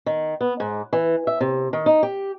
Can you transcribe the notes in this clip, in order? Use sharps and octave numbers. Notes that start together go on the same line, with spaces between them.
D#3
B3
G#2
E3
E5
C3
D#3
D#4
G4